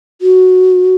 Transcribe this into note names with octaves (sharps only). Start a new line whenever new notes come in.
F#4